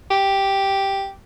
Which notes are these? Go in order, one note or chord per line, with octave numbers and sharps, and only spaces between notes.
G4